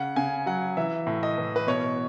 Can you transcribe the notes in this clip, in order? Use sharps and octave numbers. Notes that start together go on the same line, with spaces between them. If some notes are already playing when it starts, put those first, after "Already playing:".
Already playing: C#3 F#5
C#3 G#5
F#3 F#5
E3 E5
A2
D#5
E3
B4
B2 C#5